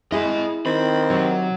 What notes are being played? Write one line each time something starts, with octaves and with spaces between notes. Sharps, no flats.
G#3 E4 G#4 D#5 B5
D#3 C4 B5
C3 F#3